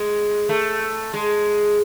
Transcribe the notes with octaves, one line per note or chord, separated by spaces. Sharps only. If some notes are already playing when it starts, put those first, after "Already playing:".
Already playing: G#3
A3
G#3